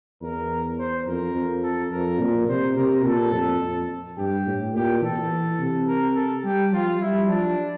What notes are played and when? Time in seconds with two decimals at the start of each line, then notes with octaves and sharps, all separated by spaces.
0.22 E2 A#4
0.79 C5
1.06 F2 A#4
1.35 F2
1.63 A4
1.91 F2 A#4
2.20 A#2
2.48 C3 C5
2.76 C3 A#4
3.04 A#2 A4
3.33 F2
3.61 F2
4.18 G2 G4
4.47 A2
4.75 A#2 G4
5.03 E3 A4
5.59 C3
5.88 A#4
6.16 A4
6.44 G3 G4
6.73 F3 F4
7.00 G3 E4
7.29 F3 D4